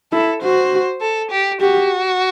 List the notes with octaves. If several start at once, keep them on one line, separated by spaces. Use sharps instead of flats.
E4 A4
F#4 C5
A4
G4
F#4 G4